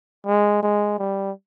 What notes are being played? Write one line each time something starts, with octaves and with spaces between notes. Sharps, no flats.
G#3
G#3
G3